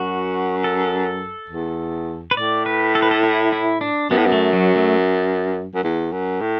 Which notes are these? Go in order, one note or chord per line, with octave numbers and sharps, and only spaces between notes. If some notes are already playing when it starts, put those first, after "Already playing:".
Already playing: F#2 F#4
A4
E2
B4
A2 D5
B4
A4
B4
A4
E4
E4
D4
F#2 B3
A2
F#2
A3
F#3
A3
F#2
E2
F#2
A2